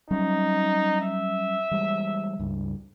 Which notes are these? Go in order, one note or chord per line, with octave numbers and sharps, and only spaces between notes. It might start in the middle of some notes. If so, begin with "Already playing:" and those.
F#3 G3 C#4 D#4
E5
E3 G3 G#3
C#2 G2